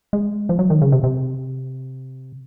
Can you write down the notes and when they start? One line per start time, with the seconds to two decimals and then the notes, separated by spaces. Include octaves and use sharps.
0.13 G#3
0.49 F3
0.59 F#3
0.70 D#3
0.82 C#3
0.92 C3
1.04 C3